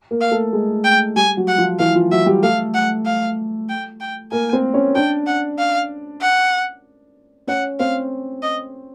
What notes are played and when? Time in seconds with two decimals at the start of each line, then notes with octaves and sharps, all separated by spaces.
0.11 A#3 A#4
0.21 F5
0.31 A3 A4
0.53 G#3 G#4
0.84 G5
1.16 G3 G4 G#5
1.37 F#3 F#4
1.48 F#5
1.58 F3 F4
1.79 E3 E4 F5
1.95 F3 F4
2.11 F#3 F#4 E5
2.26 G3 G4
2.43 A3 A4 F5
2.75 F#5
3.06 F5
3.69 G5
4.01 G5
4.32 A#3 A#4 G#5
4.53 C4 C5
4.74 C#4 C#5
4.95 D4 D5 G5
5.27 F#5
5.59 F5
6.22 F#5
7.47 C#4 C#5 F#5
7.80 C4 C5 F5
8.43 D#5